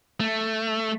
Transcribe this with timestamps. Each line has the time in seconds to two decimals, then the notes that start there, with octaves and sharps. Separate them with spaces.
0.20 A3